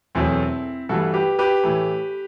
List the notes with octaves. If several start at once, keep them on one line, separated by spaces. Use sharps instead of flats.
E2 B2 F#3 A3 C4 E4
G2 E3 A3 F#4 A4
G4 B4
G4 B4
A2 E3 A3